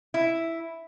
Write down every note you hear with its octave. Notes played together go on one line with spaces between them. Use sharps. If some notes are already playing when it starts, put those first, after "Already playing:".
E4